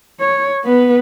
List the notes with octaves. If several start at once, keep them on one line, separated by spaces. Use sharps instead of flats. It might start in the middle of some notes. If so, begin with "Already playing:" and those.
C#5
B3 B4